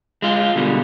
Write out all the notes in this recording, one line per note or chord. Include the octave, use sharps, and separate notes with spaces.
G#3 F4
B2 D3 G3